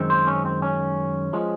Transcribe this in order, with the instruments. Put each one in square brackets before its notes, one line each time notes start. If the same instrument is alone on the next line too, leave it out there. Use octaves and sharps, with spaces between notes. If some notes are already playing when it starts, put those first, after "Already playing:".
Already playing: [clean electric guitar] F#2 D#3 G#3 C4
C5
C#4
C4
C#4
F3 G#3